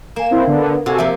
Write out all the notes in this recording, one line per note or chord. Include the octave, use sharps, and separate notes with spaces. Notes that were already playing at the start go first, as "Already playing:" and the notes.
A#3 G#5 E7
C4 E4 C5
D3 B3
C3 F#4 A4 G#5
F3 A#3 E5